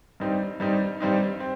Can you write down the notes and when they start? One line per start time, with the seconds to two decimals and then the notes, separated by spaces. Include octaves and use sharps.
0.20 G2 G3 C4 D#4
0.60 G2 G3 C4 D#4
1.00 G2 G3 C4 D#4
1.40 C4